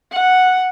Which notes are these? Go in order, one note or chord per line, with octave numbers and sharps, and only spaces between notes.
F#5